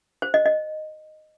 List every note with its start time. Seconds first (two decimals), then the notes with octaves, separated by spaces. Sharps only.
0.22 C5
0.34 D#5
0.46 D#5